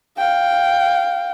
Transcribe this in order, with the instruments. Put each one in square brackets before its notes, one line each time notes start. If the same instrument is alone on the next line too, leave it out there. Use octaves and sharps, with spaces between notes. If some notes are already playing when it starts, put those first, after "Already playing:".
[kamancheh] F5 G5